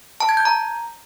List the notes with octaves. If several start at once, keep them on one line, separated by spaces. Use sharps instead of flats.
A5
G#6
G6
A#5